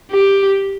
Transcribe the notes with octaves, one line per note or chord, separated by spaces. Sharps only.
G4